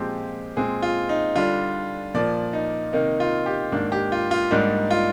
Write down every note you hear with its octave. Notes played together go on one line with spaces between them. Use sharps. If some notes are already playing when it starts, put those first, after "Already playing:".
Already playing: A#2 F3 G#3 C4 G4
A#2 G#3 C4 G#4
F4
D#4
D3 G3 D4 F4
A#2 F3 A#3 D5
D#4
C3 D#3 A#3 D#4
F4
G4
G#2 D#3 A#3 D4
G4
F4
F4
G#2 G3 A#3 D4 D#4
F4